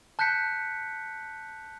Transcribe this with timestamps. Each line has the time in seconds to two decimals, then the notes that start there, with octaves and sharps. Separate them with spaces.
0.19 A5 F#6 G6 B6 C#7